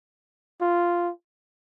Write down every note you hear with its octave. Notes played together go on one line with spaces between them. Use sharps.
F4